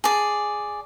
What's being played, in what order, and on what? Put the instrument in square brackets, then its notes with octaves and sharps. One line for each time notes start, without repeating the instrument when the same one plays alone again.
[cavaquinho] G#4 D5